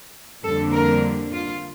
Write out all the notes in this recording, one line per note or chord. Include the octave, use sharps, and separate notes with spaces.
F2 D3 G3 A#3 D4 A4
A#4
F4